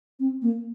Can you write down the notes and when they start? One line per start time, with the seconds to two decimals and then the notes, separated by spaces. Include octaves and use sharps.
0.20 C4
0.42 A#3